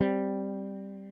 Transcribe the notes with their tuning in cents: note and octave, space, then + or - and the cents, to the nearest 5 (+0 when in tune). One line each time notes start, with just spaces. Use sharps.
G3 +0 C4 +0